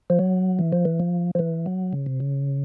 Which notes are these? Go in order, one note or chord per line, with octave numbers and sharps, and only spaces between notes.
F3
F#3
E3
F3
E3
F3
F3
E3
F#3
C#3
C3
C#3